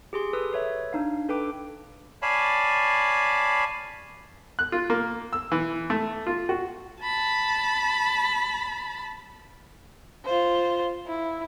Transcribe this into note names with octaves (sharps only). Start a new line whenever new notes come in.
G4 G#4 C6
A4 B4 D#6 E6
B4 C#5 E5
D4 D#4 F5
D4 A4 B4 G5 D6
C#5 D5 F5 G#5 A5 B5
F#6
F4
A#3
E6
E3
A3
F4
F#4
A5 B5
F4 C5
E4